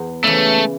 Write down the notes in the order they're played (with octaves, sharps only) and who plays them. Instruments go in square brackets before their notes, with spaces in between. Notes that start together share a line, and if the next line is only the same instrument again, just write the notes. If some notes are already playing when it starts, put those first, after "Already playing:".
Already playing: [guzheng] E2
[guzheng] C#3 E3 [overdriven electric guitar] A3